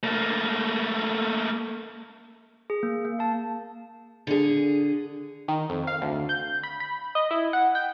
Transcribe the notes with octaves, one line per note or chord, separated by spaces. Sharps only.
A3 A#3
G#4
A#3
A#3
F5 A5
D3 G#4
D#3
F2
F5
D2
G6
B5
B5
D#5
E4
F#5
G5